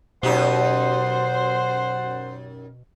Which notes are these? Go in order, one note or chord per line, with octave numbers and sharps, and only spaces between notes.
F#2 B2 D#4 G4 C5 F#5